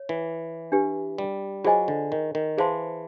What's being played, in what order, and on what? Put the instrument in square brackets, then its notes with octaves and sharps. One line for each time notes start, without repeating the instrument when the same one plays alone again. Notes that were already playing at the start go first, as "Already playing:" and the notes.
Already playing: [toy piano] C#5
[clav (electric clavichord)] E3
[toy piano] D4 G4 B4
[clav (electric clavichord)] G3
[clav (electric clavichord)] F#3 [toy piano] F4 G#4 C5 D#5 G#5
[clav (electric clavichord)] D3
D#3
D#3
[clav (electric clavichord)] E3 [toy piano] G#4 C5 F5 A5 C6